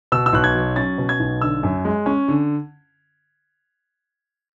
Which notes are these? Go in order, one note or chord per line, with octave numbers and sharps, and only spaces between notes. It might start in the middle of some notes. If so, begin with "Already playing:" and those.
B2 E6
E6
B1 F#6
G#6
F#3
C#4 A6
B2
G#6
B1
D3 E6
F#2
G#3
C#4
D3